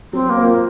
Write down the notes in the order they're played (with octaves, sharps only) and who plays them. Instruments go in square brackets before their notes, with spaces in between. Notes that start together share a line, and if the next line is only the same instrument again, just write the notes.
[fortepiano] F#3 [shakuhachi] C4
[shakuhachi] A#3
[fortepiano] C4 F4 A#4